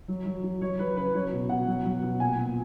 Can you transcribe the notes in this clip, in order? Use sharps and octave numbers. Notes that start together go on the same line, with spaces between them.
F#3
F#3
F#3
F#3 C#5
F#3 B4
C#3 B4
F#3 C#5
B2
B2 F#5
F#3
F#3
B2
A#2 G#5
A#2